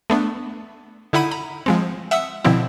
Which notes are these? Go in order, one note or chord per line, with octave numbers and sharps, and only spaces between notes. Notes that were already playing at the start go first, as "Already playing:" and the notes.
A3 B3 D4
D3 D#4 E4 F#5 B5 D#7
A#5 B5
F3 G#3 C4
E5 F#5 D#6 E6
B2 D3 F3 C4 E4